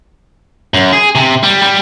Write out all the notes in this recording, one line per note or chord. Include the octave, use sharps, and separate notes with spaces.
F#2
G#4
C3
G3
G3